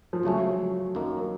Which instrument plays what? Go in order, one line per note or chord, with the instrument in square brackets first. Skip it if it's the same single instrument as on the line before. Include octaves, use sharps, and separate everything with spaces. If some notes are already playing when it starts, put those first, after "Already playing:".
[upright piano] F3
[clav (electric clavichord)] C#2 C#3 A3 C#4 [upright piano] F#3
[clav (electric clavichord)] F#2 D#3 A#3